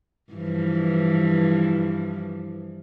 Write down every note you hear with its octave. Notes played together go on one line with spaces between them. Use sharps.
G2 E3 F3